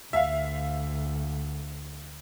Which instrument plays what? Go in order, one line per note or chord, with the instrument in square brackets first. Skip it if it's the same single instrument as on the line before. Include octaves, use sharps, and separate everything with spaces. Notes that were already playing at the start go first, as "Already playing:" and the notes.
[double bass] D2 [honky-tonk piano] E5 F5